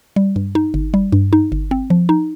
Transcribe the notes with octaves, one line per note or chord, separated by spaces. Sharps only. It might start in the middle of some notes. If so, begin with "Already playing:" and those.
G3
G2
D#4
G1
G3
G2
D#4
G1
C4
F3
D#4